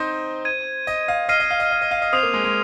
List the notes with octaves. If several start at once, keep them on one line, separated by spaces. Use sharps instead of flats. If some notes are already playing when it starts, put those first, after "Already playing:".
Already playing: C4 D#4 C5
G#6 D#7
D#5
F5
D#5 F6 C7 D#7
D#5
F5
D#5
D#5
D#5
F5
D#5
C4 D#6 C7 F7
A#3
G#3
G#3